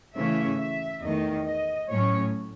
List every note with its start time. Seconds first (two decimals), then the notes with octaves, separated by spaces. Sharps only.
0.15 C#3 E3 A3 C#4 E5
0.59 E5
1.02 E2 D#3 A3 D#5
1.45 D#5
1.88 A2 F#3 C#4 C#5